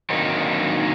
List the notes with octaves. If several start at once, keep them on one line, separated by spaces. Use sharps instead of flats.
D3 D#3 F#3 A#3 C4 D#4